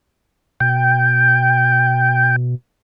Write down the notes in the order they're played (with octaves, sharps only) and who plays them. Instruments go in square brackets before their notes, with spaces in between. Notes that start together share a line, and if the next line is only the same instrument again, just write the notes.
[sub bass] B2 [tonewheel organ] G5